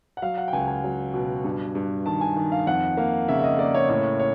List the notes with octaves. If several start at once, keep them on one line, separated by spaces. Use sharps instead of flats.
F#5
F#3 F5
F#5
G5
C#2 G#5
G#5
F#3
B2
G2
G2
D#3 A5
G#5
D#3
F5
F2 F#5
A#3 F5
C#3 E5
E5
D#5
A#3 D5
C#5
A2 C#5
C#5